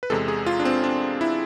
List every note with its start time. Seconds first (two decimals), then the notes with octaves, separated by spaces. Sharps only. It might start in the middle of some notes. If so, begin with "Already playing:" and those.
0.03 B4
0.10 E2 C3 G#3 A4
0.28 G#4
0.46 F4
0.60 D4
0.65 C4
0.84 D4
1.21 E4